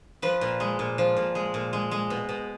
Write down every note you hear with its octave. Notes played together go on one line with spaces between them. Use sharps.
F3 B4
A#2
G#3
A#2
F3
A#2
G#3
A#2
G#3
G#3
B2
B2